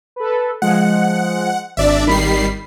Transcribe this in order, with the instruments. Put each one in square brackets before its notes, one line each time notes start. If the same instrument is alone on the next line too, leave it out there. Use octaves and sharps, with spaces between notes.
[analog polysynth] A4 B4
[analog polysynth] F3 G#3 [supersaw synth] F#5
[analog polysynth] G#1 [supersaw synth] D4 D5 E5
[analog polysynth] G#1 B5 B6 [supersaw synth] D#3 G3 C7